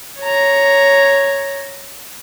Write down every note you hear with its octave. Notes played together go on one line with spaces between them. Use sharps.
C#5 A#5